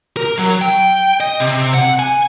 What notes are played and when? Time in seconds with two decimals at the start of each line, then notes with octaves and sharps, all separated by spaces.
0.17 A#4
0.38 F#3
0.62 G5
1.20 D#5
1.40 C3
1.74 F#5
1.99 G#5